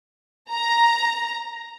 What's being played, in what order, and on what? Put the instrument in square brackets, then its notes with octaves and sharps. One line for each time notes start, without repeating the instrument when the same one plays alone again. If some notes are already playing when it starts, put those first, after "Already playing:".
[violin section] A#5